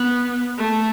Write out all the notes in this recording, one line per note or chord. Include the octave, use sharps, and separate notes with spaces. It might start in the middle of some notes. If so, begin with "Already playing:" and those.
Already playing: B3
A3